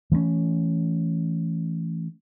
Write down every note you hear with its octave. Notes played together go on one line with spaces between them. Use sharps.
E3 A3 B3 C#4